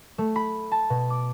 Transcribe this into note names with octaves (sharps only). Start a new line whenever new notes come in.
A3
B5
A5
B2
D6